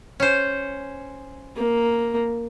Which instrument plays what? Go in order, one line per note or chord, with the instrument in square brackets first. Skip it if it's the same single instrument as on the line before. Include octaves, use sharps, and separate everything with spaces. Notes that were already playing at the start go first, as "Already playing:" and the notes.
[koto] C#4 C5
[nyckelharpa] A#3